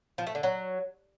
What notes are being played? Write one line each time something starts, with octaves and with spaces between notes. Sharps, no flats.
F3
A3
D3
F#3